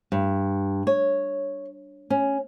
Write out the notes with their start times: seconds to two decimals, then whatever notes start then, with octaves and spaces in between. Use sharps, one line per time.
0.12 G2
0.87 C#5
2.10 C#4